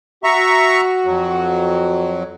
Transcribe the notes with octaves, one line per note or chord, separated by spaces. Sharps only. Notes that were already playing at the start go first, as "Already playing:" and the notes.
F#4 E5 A#5 C#6
F2 F#3